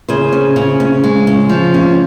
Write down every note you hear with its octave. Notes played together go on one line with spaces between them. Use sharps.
C#3 G#4 C5
C#4
C#3
C#4
G#3
C#3
F3
C#4